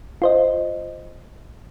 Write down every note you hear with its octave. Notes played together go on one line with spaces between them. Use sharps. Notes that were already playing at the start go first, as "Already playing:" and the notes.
F4 C5 D#5